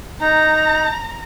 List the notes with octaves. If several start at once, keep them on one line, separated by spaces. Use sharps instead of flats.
D#4 A#5